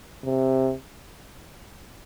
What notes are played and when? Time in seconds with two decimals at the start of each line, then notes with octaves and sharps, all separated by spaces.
0.24 C3